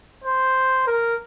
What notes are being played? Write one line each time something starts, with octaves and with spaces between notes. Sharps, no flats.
C5
A#4